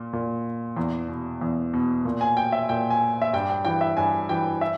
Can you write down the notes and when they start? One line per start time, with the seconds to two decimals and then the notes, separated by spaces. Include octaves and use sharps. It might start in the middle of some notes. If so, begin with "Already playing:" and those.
Already playing: A#2
0.13 A#2
0.77 E2
1.08 B2
1.41 E2
1.74 B2
2.05 A#2
2.21 G#5
2.37 G5
2.52 E5
2.69 A#2 G5
2.90 G#5
3.22 E5
3.33 G2 G5
3.49 G5
3.65 E3 G5
3.81 E5
3.97 G2 G#5
4.29 E3 G5
4.61 E5